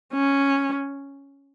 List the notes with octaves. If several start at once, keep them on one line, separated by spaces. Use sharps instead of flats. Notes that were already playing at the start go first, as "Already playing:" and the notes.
C#4